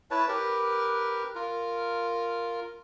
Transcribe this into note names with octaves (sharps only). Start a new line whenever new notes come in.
E4 B4 C#5 A5
G4 A#4 B4
F4 A#4